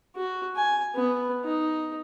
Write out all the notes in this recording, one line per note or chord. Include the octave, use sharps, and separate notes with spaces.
F#4
G#5
B3
D#4